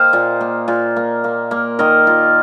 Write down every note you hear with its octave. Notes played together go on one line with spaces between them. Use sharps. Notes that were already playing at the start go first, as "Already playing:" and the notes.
Already playing: A#3 C5 D#5 F5 G5
A#2
A#3
A#2
A#3
A#3
A#3
D#3 A#4 D#5
A#3 F4